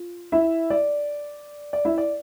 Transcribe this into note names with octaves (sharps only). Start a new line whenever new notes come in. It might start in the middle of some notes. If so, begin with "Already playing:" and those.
Already playing: F4
E4 E5
D5
D5
E4 E5
D5